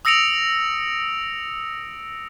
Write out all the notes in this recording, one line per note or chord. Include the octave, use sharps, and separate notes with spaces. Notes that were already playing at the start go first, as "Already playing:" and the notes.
D#6 E6 A#6 C#7 D7 F7